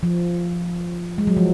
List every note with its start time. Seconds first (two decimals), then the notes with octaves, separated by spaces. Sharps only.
0.03 F3
1.18 G#3
1.27 F#3
1.37 F3